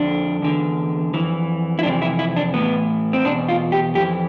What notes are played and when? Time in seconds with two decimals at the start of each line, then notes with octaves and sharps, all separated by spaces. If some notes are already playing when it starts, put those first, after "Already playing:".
Already playing: F2 D3 D4
0.42 E2 D3
1.14 F2 E3
1.79 E4
1.83 F2 C3 E3 D4
2.02 E4
2.19 E4
2.36 D4
2.54 A2 E3 B3
3.13 C4
3.25 E2 B2 D4
3.49 F4
3.72 G4
3.95 F2 G4
3.99 E3